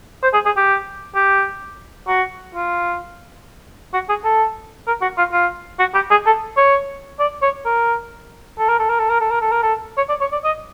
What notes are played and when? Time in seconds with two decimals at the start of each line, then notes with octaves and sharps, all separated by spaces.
0.23 C5
0.34 G#4
0.46 G#4
0.57 G4
1.15 G4
2.08 F#4
2.55 F4
3.94 F#4
4.09 G#4
4.24 A4
4.87 A#4
5.02 F#4
5.18 F4
5.33 F4
5.79 F#4
5.95 G4
6.11 G#4
6.26 A4
6.57 C#5
7.19 D5
7.42 C#5
7.66 A#4
8.59 A4
8.69 A#4
8.79 A4
8.90 A#4
8.99 A4
9.10 A#4
9.20 A4
9.31 A#4
9.41 A4
9.52 A#4
9.63 A4
9.97 C#5
10.09 D5
10.21 C#5
10.32 D5
10.44 D#5